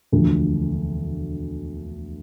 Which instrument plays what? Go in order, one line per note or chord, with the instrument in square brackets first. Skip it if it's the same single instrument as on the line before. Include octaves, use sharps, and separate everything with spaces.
[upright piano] E1 D2 D3 F3